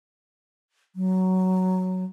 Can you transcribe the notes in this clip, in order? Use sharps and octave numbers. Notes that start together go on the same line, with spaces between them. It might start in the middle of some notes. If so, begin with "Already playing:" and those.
F#3